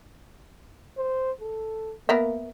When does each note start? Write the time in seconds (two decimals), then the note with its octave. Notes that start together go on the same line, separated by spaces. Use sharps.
0.98 C5
1.41 A4
2.09 A#3 B3 A#4 E5